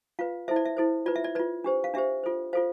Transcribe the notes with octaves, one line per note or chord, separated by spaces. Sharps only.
F4 B4 F5
E4 A4 C5 E5
D5
E5
E4 A4 C5
F4 B4 D5
E5
D5
F4 B4 D5
D4 G4 C5
F5
D4 G4 C5 E5
F4 A4 C5
F4 A4 C5 F5